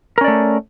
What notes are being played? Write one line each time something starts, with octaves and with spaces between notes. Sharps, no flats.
A3 C#4 A#4 D5